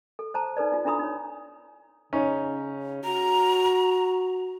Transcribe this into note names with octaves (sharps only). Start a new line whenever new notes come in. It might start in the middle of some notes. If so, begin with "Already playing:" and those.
A4
C5 A5 A#5
D#4 A4 B4 D5
D#4 F4
D4 E4 A4 A#5 B5 D#6
D#4 C#5
C#3 C#4 D#4
F#4 A#5